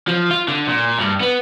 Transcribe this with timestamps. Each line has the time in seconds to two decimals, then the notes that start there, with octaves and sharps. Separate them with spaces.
0.08 F3
0.31 F4
0.48 D3
0.67 A#2
0.99 G2
1.21 B3